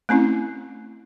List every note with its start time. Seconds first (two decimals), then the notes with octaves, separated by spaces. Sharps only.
0.09 A3 C4 C#4 E4